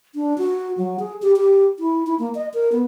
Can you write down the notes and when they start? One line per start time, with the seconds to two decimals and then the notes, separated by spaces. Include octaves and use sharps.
0.15 D4
0.38 F#4
0.78 F#3
1.00 G#4
1.22 G4
1.36 G4
1.79 E4
2.07 E4
2.19 A#3
2.35 D#5
2.54 A#4
2.72 B3